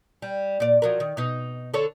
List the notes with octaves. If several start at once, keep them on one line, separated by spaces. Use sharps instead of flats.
G3
A#2 D5
F3 F#3 A#4
D#3
B2 D#4
D3 A4 C#5